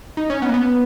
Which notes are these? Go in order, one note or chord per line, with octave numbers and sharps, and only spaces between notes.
D#4
C#4
B3
A#3
B3